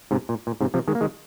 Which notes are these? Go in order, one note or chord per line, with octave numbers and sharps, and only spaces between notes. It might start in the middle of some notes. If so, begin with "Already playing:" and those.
G#2 C3
A#2
A#2
G#2 C3
C3 F3
D#3 G#3
A#3
D#3 G#3